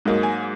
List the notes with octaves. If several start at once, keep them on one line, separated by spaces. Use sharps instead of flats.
G#2 F#3 A#3 D#5
G#5